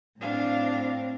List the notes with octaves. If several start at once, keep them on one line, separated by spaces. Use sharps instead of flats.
A2 C4 D4 F5